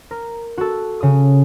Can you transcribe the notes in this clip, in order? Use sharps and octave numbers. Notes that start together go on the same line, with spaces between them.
A#4
F#4 A4
C#3 D#6